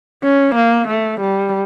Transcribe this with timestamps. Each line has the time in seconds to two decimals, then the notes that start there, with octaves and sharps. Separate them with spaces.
0.23 C#4
0.55 A#3
0.88 A3
1.21 G3